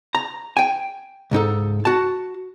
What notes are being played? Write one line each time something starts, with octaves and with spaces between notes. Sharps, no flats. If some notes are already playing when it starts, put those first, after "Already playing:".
A#5
G5 G#5
C#2 G#2 D#4 A4
F#4 A5